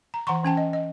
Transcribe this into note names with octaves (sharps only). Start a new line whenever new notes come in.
A#5
E3 F#5 A#5 C6 C#6
E3 C#4 G5 A5
D#5
D#5